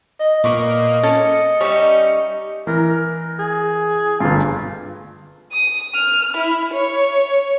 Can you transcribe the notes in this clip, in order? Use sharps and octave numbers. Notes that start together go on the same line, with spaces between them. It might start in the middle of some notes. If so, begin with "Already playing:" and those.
D#5
A#2 A#3 B4 D#5 C#6 D6
C#4 A4
C#7
G3 C#4 D#4 E5 C#6
E3 A#4
G#4
G1 G2 F4
D#6
F6
E4
C#5